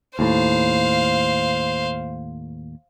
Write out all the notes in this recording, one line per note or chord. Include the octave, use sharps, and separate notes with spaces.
D#2 A2 C5 F5